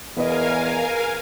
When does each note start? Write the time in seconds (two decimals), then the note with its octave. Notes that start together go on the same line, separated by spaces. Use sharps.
0.16 E2 G#4 A#4 B4 D#5 F5 G#5